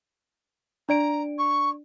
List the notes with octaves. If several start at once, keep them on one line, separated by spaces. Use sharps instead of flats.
D4 D5 A#5 D7
C#6